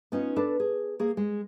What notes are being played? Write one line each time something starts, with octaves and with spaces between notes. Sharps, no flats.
B3 C#4 D#4 F4
D4 A4 B4
G#4
A#3 G#4
G#3